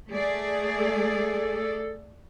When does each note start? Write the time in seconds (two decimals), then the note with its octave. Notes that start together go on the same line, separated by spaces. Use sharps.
0.11 A3 G#4 D5
0.79 A4